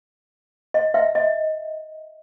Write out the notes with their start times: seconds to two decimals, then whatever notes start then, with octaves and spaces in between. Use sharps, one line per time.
0.74 D#5
0.94 E5
1.15 D#5